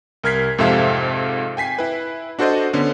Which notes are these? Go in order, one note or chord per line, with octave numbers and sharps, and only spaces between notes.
C2 A#4 F6 G#6 B6 C7
F2 G#2 C3 A4 E5 F5
G5 G#5 B6 C7
E4 B4
D4 F#4 A4 C5 D5 D#5
D3 B3 C#4